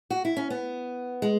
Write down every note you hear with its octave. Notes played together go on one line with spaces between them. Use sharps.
F#4
E4
C#4
B3
G#3